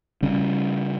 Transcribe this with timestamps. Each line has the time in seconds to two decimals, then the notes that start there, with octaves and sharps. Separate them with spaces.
0.22 C#3 G3 C#4